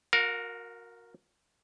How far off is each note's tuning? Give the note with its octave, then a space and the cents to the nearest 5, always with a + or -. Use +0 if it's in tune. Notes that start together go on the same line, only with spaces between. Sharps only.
F#4 -20 A#4 +0 F5 +35